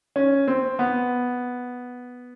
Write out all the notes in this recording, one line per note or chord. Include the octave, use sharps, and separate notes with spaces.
C#4
C4
B3